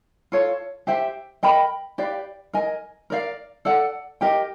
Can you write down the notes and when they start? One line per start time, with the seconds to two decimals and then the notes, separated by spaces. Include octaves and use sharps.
0.32 F4 A4 C#5 F5
0.87 G4 C5 E5 G5
1.43 A#4 D#5 G5 B5
1.98 G4 B4 D5 F5
2.53 A#4 D#5 G#5
3.10 A#4 D5 F5
3.65 A4 D5 F#5
4.21 G4 A#4 D#5 G5